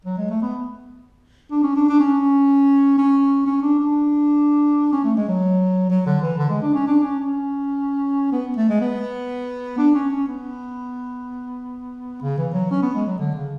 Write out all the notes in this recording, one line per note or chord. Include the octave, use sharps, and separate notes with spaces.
F#3
G#3
A3
B3
D4
C#4
D4
D4
C#4
C#4
C#4
D4
D4
C#4
A3
G#3
F#3
F#3
D3
E3
D3
G#3
D4
C#4
D4
C#4
C#4
B3
A3
G#3
B3
D4
C#4
C#4
B3
C#3
E3
F#3
C#4
B3
G#3
F#3
D3
C#3